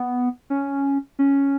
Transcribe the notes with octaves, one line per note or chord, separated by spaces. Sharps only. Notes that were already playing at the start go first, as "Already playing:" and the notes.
Already playing: B3
C#4
C#4